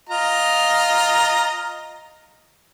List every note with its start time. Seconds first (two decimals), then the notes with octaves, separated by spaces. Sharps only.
0.09 F4 D#5 A#5